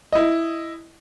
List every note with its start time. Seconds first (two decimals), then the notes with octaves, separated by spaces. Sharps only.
0.13 E4 D#5